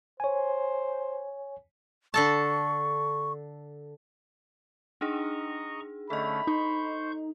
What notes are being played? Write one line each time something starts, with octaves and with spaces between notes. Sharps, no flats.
C5 C#5 G#5
D3 A4 A5 C#6
D4 D#4 G#4 D#5 A#5 C#6
D3 A3 C#4 A4 D#5 B5
D#4 C5 C#6 G6